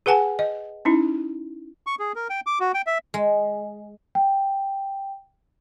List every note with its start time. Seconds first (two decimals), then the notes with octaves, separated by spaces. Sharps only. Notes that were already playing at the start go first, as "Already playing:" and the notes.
0.06 G#4 B4 F#5 G#5 A5
0.39 D#5
0.85 C#4 D#4 E4
1.87 C#6
1.99 G#4
2.15 A#4
2.30 G5
2.46 D6
2.60 F#4
2.74 G5
2.87 E5
3.14 G#3
4.15 G5